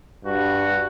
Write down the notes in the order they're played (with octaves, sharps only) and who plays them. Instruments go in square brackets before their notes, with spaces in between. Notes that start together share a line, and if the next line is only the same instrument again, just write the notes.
[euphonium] G2 [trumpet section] F#4